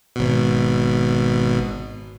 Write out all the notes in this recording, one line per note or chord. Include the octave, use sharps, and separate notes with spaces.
G#1 B2